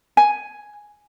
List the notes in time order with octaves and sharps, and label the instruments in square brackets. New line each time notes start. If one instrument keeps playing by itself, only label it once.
[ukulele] G#5